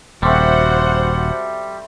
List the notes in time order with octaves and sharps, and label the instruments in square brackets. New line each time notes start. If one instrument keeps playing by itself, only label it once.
[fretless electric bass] D#1 [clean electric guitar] G3 [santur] A3 C4 [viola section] F#4 C5 F#5